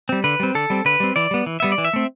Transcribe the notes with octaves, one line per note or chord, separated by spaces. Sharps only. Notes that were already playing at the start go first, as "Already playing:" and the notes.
G3 C4
D3 B4
G3 C4
D3 A4
G3 C4
D3 B4
G3 C4
E3 D5
G3 B3
E3
G3 B3 E5
D5
E3
E5
A3 C4